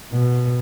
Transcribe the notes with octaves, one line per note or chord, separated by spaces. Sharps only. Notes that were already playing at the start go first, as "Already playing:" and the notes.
B2